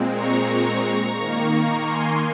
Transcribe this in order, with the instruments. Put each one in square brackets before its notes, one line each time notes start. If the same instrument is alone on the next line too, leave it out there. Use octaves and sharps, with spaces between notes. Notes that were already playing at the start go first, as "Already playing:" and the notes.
Already playing: [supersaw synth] A#2 G#3 C4
A#5 C#6
A#5 C#6
D#3 A#3
G#5 C6